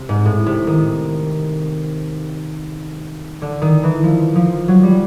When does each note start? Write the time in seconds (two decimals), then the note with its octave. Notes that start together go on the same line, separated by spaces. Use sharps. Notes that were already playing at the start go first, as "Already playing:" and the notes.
Already playing: C3
0.09 G#2
0.25 A2
0.46 C3
0.67 D#3
3.42 D3
3.62 D#3
3.83 E3
4.04 F3
4.36 F3
4.68 F#3
4.83 G3